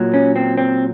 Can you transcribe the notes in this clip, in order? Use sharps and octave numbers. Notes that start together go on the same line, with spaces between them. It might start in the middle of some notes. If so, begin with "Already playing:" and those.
Already playing: A#2 F#3
C#4
C4
C4